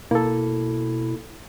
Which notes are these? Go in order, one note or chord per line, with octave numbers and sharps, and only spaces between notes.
B2 A#3 E4 A4